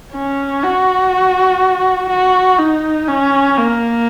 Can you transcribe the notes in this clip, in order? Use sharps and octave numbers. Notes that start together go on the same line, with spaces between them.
C#4
F#4
F#4
D#4
C#4
A#3